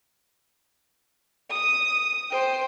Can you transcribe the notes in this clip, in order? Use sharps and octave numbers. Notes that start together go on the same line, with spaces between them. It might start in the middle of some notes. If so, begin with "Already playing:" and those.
D#6
C5 G5